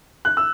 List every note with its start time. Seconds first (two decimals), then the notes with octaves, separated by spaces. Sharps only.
0.25 F#6
0.37 E6